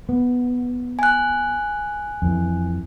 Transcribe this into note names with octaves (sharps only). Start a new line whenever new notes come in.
B3
G#5 F#6
F2 E3